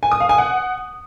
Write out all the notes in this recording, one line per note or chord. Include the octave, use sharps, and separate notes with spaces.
G#5
D#6
F5
G#5
F#5